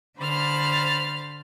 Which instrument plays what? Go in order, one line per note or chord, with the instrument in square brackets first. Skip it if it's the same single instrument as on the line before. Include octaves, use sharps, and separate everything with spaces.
[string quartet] D3 C5 B5 F6 A6